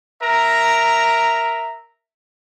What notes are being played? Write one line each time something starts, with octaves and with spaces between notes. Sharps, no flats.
A#4 E5 A#5